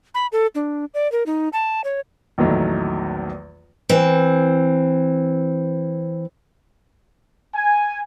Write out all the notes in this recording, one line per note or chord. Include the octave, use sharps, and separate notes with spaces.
B5
A4
D4
D5
A#4
D#4
A5
C#5
A#1 E2 D#3 F#3 A3
E3 C4
G#5